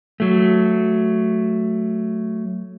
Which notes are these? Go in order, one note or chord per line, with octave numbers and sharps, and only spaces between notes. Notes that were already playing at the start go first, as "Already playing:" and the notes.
F#3 A3